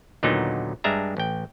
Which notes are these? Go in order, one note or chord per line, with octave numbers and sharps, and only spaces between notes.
D#2 A#2 D3 F#3 B3 D#4
G2 G#3 D4 E5 A#5
A1 G5